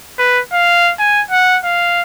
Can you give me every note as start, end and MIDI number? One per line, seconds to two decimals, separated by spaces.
0.19 0.40 71
0.53 0.93 77
0.99 1.22 80
1.31 1.58 78
1.65 2.02 77